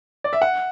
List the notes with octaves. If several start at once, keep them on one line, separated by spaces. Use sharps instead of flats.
D5
E5
F#5